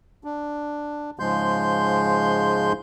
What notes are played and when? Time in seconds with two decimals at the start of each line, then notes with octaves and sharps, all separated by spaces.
0.24 D4
1.19 G#2 C#3 F3 G#3 C6 G6